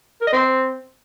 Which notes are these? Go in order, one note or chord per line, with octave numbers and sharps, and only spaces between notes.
A#4
D#5
C4